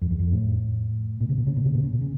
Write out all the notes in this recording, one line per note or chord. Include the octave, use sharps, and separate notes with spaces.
F2
E2
F2
A2
A#2
C#3
A#2
C#3
A#2
C#3
A#2
C#3
A#2
C#3